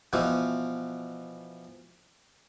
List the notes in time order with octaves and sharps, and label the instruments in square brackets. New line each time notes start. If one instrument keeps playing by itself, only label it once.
[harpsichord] B2 E3 F3